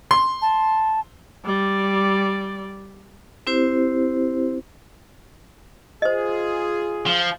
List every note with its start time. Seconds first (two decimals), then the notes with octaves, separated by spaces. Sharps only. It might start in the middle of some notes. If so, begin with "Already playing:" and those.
0.11 C6
0.42 A5
1.45 G3 D5
3.47 C4 E4 G4 C5
6.02 F4 G#4 C5 D#5
7.06 F3